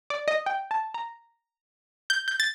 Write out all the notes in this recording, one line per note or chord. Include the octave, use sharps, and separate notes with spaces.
D5
D#5
G5
A5
A#5
G6
G6
A6